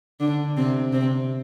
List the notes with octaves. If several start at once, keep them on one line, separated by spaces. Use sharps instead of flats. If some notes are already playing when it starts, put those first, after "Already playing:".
D3 D4
C3 C4
C3 C4